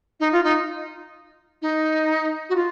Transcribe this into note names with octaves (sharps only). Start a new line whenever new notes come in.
D#4
F4
D#4
D#4
F#4
F4